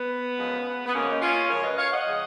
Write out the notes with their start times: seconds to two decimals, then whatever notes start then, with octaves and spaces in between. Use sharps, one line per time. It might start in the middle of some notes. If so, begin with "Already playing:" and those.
Already playing: B3
0.38 F#2 F3 G#3
0.86 B3
0.94 F#2 C#3 F3 G#3 A#3 C#4
1.11 D#4
1.22 C#4 F4
1.50 F#2 C#3 F3 G#3 A#4 C#5
1.64 B4 D#5
1.78 C#5 F5
1.92 D#5 F#5
2.06 C#3 F3 G#3